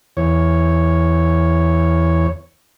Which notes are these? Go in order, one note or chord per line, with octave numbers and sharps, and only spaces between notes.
E2 C#5